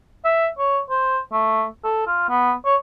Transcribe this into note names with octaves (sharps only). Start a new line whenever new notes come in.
E5
C#5
C5
A3
A4
F4
B3
C#5